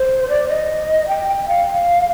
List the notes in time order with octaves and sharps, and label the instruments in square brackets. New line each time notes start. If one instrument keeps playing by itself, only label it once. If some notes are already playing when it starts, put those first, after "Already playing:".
Already playing: [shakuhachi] C5
D5
D#5
G5
G5
F5